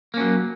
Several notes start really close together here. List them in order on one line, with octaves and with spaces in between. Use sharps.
A#3 C#4 F#3